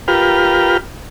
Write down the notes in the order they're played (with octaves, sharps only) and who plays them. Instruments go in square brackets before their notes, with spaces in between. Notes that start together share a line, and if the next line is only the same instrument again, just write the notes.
[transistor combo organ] F4 G4 A#4 B4 G5 F6